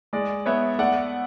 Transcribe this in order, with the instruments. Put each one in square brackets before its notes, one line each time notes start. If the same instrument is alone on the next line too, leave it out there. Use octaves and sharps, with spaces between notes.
[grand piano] G#3 D5
B3 C#5 E5
A3 D5 F#5